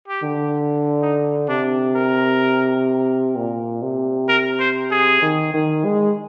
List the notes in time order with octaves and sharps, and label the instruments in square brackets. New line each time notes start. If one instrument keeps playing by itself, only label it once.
[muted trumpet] G4
[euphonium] D3
[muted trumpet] D#4
[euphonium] C3 [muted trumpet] D4
[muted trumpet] A#4
[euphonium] A#2
C3
[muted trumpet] A#4
C5
G#4
[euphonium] D#3
D#3
G#3